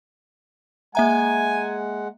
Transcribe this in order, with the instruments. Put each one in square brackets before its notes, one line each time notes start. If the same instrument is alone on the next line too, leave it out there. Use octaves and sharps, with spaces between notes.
[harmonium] G#3 F#5 [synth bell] A#3 E5 A#5 [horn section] G#5